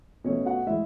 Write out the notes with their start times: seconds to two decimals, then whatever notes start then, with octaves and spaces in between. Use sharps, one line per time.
0.24 B2 A3 C#4 C#5
0.46 F#4 F#5
0.67 A2 G#3 E4 E5